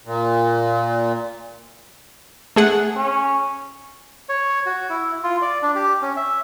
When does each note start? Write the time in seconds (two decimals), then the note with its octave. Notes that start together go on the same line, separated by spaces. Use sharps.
0.05 A#2
2.56 A3 G#4 F#5
2.96 C#4
4.29 C#5
4.66 F#4
4.89 E4
5.23 F4
5.42 D5
5.62 D4
5.75 G4
6.02 C#4
6.17 E5